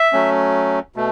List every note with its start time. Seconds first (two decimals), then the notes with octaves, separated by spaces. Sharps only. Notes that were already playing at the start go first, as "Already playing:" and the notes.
Already playing: E5
0.13 F#3 A3 C#4
0.96 B2 A3